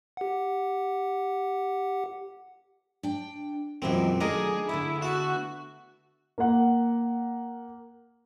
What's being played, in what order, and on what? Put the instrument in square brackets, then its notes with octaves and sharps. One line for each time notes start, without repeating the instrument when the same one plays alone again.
[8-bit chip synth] G4 F#5
[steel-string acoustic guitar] D4 G5
[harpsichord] C#2 F#2 C4 [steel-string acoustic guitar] B2 E3 A#4
[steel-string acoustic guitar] D#3 F#3 A3 [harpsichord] D4 A#4 D#5 [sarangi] G#4
[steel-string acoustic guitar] D3 A3 B3 [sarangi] E4
[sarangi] F#4 [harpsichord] E5 A5
[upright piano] A#3 F#5